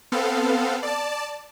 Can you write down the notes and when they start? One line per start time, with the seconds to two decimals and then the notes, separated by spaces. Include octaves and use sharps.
0.12 B3 C4 A4 F5
0.83 D5 A5